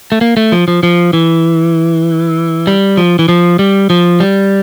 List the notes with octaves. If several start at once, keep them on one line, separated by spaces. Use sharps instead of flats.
A3
A#3
A3
F3
F3
F3
E3
G3
F3
E3
F3
G3
F3
G3